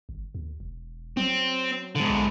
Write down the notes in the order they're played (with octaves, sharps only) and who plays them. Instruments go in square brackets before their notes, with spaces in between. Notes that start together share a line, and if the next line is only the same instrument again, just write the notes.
[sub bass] G1
D#2
E1
[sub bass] F#3 [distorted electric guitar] C4
[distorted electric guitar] G#2 D3
[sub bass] A#1